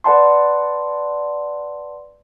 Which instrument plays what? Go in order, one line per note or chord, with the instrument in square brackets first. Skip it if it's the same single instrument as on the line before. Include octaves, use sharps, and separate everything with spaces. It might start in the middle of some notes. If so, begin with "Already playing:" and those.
[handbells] B4 D5 F#5 A5 C6